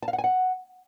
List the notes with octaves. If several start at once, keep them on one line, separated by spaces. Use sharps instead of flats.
A5
F5
F#5
G#5
F#5